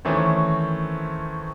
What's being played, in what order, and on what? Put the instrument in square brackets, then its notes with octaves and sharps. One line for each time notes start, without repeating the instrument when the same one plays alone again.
[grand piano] D#3 E3 A3 C4 C#4